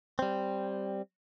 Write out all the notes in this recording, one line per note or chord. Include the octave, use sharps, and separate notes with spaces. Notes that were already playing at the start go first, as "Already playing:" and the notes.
G3 C4